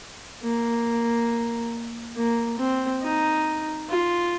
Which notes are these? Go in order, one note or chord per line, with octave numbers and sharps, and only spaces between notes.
A#3
A#3
C4
D#4
F4